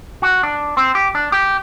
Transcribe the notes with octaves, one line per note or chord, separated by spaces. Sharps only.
F#4
D4
C4
G4
D4
G4